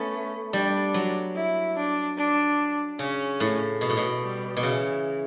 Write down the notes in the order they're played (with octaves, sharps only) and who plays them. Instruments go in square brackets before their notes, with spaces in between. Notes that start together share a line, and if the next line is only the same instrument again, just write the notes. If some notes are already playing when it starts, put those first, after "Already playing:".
Already playing: [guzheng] A3 B3 [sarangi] C#4
[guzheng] G3 [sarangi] D4
[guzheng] F#3
[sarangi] E4
D4
D4
[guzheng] C#3 [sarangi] C#4
[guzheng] A2
B2
A2
B2
[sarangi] G3
[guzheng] B2
[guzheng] C#3 [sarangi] E3